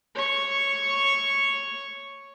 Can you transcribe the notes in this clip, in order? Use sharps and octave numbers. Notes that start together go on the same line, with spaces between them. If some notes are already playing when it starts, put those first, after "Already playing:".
C#5 C#6